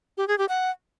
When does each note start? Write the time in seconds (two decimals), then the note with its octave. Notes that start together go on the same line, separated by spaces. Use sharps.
0.17 G4
0.28 G#4
0.38 G4
0.49 F#5